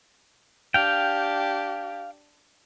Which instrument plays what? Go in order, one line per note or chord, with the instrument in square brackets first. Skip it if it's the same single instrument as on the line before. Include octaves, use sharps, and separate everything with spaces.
[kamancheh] D4 G4 [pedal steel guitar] F5 G5